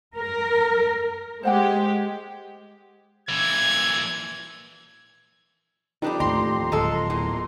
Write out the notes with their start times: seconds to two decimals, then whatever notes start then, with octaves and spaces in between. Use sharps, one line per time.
0.17 A#4
1.43 G#3 G4 C5 F#5 G5
3.29 A#2 E3 G#6
6.02 F2 G3 D4 D#4 G4 B4
6.20 D#2 A2 G4 A#5 C6
6.72 D1 G#3 A4
7.10 E2 A#2